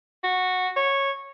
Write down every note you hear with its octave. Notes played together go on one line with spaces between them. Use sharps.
F#4
C#5